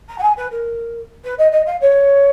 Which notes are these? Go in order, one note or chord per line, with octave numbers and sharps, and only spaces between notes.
A#5
F#5
G#5
B4
A#4
B4
D#5
D#5
F5
C#5